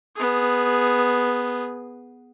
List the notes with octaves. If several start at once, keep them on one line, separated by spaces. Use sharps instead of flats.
B3 G#4